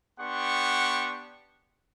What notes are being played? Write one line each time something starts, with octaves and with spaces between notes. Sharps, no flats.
B3 D4 G4 F#5 C6 C#6